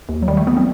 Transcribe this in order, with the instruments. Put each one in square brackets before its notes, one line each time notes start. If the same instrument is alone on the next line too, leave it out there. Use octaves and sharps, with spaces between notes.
[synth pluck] D#2
F#3
D#3 G3
A3
D#3 B3
C4